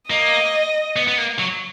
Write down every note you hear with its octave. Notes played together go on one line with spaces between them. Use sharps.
A#3 D#5
B3
B3
A#3
F#3